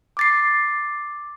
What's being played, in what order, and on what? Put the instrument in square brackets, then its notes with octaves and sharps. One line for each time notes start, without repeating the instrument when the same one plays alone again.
[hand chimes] D6 A6 C7